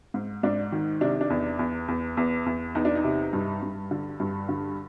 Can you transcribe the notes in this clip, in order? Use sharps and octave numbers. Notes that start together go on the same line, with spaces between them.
G#2
G#2 D4
D#3
C3 D4
D4
E2
E2
E2
E2
E2
E2 D#4
D4
D#4
C3
G2
G2
D3
G2
D3